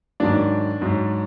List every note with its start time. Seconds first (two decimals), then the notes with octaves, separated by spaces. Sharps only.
0.20 G#2 D#3 F#3 D4 D5
0.81 G#2 F#3